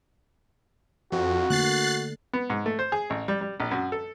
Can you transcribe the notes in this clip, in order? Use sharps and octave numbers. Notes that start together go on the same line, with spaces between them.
F2 F#4
D3 A3 A#3 F#6 A6 C7
B3
G#2
A3
C5
G#4
A1
G3
G3
A#1
F#2
A4